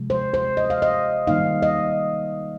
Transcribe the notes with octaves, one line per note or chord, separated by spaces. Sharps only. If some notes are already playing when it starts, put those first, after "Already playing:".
Already playing: C3 F3 G#3
C5
C5
D#5
F5
D#5
D#3 G3 A#3 D#4 F5
D#5